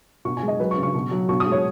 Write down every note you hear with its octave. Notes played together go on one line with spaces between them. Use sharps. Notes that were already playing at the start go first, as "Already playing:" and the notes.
B2 C#6
G#5
G#3
D#5
F#3 B4
C#6
C#3
C#6
B2
F#3
B2 C#6
D#6
G#3
C#5